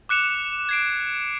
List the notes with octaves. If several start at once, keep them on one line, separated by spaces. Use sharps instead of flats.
D6 F#6 C#7 E7 F7
G#6 C7 D7